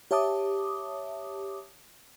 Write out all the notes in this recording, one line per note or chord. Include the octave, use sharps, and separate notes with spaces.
G4 C#5 E5 A5 D6 D#6